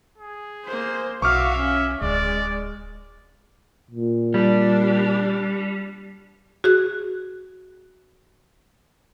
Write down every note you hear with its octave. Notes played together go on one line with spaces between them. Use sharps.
G#4
A#3 C5
B1 F#4 E5 F5 C#6 D6 F6
C#4
D1 G#3 D5
A#2
G3 D4 G4
F#4 G#4 F#6